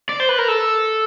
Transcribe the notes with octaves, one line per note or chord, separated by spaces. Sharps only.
D5
C5
B4
A#4
A4